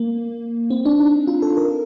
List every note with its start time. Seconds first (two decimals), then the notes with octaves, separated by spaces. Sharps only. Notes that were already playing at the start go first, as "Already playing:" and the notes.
Already playing: A#3
0.70 C4
0.85 D4
1.00 D#4
1.27 F4
1.42 A4
1.57 A#4